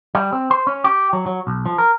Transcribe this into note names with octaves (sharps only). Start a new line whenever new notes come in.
G3
C4
C5
C#4
G4
F#3
F#3
B1
F3
A#4